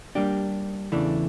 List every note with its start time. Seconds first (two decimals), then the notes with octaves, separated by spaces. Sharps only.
0.15 G3 A#3 D4 G4
0.92 E2 C#3 E3 A3 D4